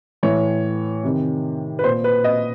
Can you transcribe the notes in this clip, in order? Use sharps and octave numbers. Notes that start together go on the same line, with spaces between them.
A2 E3 C#5
C3 D#3
B4
A#2 C5
B4
D#5